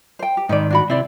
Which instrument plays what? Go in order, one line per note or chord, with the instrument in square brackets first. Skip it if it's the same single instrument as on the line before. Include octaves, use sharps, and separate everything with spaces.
[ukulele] C5 G5
G4
[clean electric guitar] G#2 D#3 [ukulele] D#4 B4 D5
[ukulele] D4 F#4 B5
[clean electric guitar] C3 C4 [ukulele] E4 D5